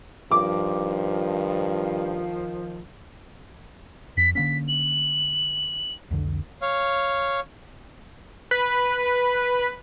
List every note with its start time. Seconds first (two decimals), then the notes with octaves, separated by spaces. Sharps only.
0.31 G2 D#3 F3 D6
4.17 F2 B6
4.35 D3 A#3 C#4 B6
4.68 F#7
6.11 C2 F2 D3
6.62 C#5 F5
8.51 B4